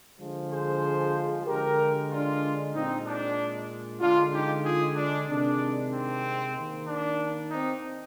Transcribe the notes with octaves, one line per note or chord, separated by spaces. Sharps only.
D3 F3 G#3
G#4 C5
D3 G#3 G4 A#4
D4 F4
A#2 G#3 C4 D#4
D4
D3 G#3 D4 F4
D#4 G4
F4 G#4
D4
C3 D#3 G#3 D4
C4
D#3 A#3
D4
C4 D#4